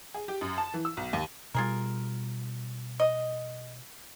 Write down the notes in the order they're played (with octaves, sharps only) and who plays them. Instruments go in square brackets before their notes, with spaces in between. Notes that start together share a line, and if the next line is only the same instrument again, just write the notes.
[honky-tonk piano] G#4
G4
F#2
A5
E3
E6
B1
D#2
[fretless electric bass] B2 G3 [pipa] F4 G#4 A#4
[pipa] D#5